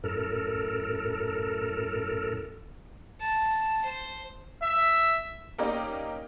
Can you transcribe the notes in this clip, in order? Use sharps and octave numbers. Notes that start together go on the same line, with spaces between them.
F#2 A2 A4 A#4
A5
C5
E5
A#3 C#4 D#4 G4 D5 D#5